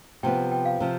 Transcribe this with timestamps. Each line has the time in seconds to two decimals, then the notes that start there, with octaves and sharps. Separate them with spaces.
0.23 C3 F3 B3 G5
0.37 A5
0.51 G5
0.65 F5
0.80 C3 F3